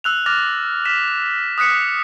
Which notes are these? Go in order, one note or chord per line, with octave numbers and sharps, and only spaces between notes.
E6 F#6 F7
D6 F6 F#6 A6 A#6 F7
F6 B6 E7
D#6 F#6 B6 C#7